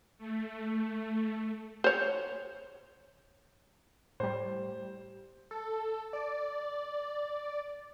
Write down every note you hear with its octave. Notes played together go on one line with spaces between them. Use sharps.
A3
C5 C#5
A2 G3 C5
A4
D5